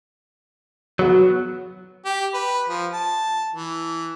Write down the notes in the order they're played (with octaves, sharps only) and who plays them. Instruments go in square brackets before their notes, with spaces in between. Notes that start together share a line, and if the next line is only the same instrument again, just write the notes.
[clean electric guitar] F#3 [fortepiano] B3 F#4
[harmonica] G4
B4
F3
A5
E3